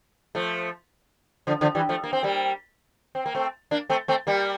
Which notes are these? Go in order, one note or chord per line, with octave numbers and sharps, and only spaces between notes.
F3 A3
D3 F3
D3 F3
E3 G3
F3 A3
A#3
C4
G3 A#3
C4
A#3
A3 C4
A#3 D4
A3 C4
A3 C4
G3 A#3